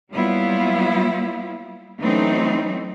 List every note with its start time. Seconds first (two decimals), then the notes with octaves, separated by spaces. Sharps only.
0.11 F#3 G3 A#3 B3 E4 F4
2.00 E3 F#3 A3 C4 C#4 D#4